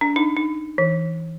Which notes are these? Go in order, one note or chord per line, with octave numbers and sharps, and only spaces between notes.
D4
D#4
D#4
E3